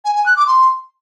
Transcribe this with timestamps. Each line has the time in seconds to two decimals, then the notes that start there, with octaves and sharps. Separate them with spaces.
0.05 G#5
0.15 G#5
0.26 F#6
0.36 D6
0.47 C6